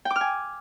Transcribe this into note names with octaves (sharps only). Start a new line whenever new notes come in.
G5
D6
F6
G#5